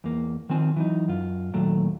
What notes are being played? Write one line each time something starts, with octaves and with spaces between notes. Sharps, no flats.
E2 A#3
D#3 F3 C4 G#5
E3 F#3 D#4
F#2 F4
D#2 A#2 F#3 A3